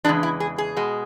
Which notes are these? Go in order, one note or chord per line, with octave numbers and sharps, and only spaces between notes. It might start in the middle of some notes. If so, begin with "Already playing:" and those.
E2 C#3 E3 G#3 D4
E4
G#4
G#4
B2 G#3